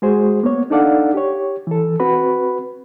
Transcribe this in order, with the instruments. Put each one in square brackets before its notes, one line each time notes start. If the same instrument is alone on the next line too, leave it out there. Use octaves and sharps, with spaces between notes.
[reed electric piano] G#3 F#4 G#4 C5
A#3 B3 C#5
D4 D#4 A4 D5 F5 F#5
G4 C#5
E3 A4
C4 F#4 B4 B5